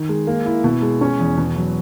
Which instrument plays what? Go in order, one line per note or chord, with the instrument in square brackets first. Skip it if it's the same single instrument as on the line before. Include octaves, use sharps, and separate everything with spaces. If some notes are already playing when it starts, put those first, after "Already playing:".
Already playing: [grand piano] D#3
G#3
A#3
E4
B2
G#3
C#4
E2
B2
F#3